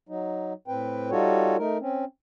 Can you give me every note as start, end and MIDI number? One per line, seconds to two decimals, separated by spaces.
0.09 0.53 54
0.09 0.53 63
0.68 1.10 45
0.68 1.10 60
0.68 1.10 71
0.68 1.10 79
1.11 1.57 55
1.11 1.57 63
1.11 1.57 65
1.11 1.57 66
1.11 1.57 69
1.11 1.57 73
1.58 1.78 57
1.58 1.78 63
1.58 1.78 70
1.81 2.05 60
1.81 2.05 61